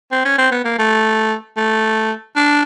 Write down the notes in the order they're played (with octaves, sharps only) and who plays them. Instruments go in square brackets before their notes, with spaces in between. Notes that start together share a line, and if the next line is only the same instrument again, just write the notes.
[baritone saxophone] C4
C#4
C4
B3
A#3
A3
A3
D4